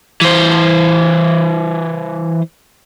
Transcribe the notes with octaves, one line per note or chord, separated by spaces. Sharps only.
E3 C5